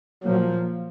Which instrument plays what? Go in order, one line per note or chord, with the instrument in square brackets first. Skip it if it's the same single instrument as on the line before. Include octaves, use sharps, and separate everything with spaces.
[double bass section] A#2 F3 A#3 [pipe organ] F#3